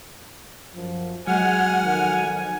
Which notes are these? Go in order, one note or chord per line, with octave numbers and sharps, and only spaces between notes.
F#2 F3
F#3 G#3 F#5 G#5 F6
F2 D#3 G#5